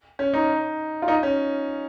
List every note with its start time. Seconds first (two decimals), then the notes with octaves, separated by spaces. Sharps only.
0.19 C#4
0.34 D#4
1.02 F4
1.08 D#4
1.23 C#4